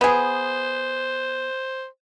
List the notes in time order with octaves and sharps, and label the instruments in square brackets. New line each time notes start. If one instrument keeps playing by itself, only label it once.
[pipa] B3 G#4 [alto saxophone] C5